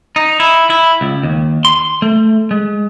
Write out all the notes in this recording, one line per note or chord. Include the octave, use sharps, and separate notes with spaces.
D#4
E4
E4
C#2
D#2
C6
A3
G#3